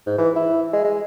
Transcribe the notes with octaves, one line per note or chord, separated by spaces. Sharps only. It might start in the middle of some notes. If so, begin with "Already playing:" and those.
G#2
E3
E4
G#3
G#3